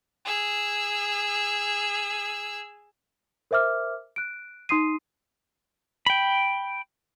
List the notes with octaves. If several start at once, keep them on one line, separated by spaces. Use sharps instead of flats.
G#4 E6
A#4 C5 E5 D6 F6
F#6 D7
D#4 C6 D#6 C7 D#7
G5 B5